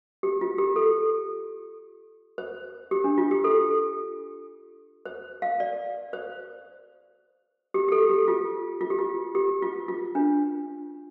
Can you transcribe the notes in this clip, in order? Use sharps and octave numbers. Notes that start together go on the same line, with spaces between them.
G4
F4
G4
A4
C5
G4
D4
F4
G4
A4
C5
F5
D5
C5
G4
G4
A4
G4
F4
F4
G4
F4
G4
F4
F4
D4